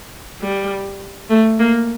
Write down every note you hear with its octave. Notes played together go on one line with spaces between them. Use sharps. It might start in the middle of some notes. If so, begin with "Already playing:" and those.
G3
A3
A#3